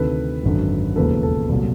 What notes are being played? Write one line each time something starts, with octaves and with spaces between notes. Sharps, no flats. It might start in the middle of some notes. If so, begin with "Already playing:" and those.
Already playing: D2 C3 D#3 A4 B4
G#1 F#2 D3
E1 D#2 C#3 F3 A#3 A4 B4
A4
C2 A#2 F#3 A4